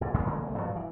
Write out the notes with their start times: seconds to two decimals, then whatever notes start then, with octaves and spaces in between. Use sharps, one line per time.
0.01 A#1 G#2
0.14 A#1 E2 C#3 G#3
0.26 C#2 D3 G#3 A#3
0.44 C2 A3
0.58 G2 F3 F#3
0.76 E3